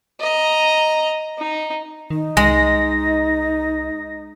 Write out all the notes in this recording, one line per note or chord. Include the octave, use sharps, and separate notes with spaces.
D#5 A#5
D#4
D#3 D#4
C2 G#3 A#6